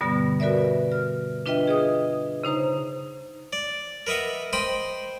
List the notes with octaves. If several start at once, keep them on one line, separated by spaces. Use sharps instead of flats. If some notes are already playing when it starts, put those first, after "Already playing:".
G2 B2 D3 G3 B3
F#4 A#4 B4 D5 E5
F6
D4 F4 B4 D#5 E5 G5
G#4 D#5 D#6
C#3 D#4 C5 A#5
D5
A#4 B4 D#5 E5 F#5
C5 D#5 G5 B5 C6